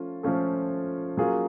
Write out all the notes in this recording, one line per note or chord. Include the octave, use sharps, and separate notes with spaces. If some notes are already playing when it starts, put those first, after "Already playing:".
Already playing: F3 A3 C#4 F4
F3 A3 C#4 F4 A4
F#3 A#3 C#4 F4 G#4